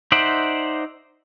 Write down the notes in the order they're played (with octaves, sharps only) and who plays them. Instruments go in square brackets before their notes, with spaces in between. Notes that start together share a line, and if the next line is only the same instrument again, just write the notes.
[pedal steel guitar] D#4 C5 D5 E5 F#5